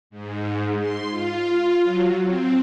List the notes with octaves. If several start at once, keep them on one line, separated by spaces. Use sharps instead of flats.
G#2
C6
F4
F#3
C4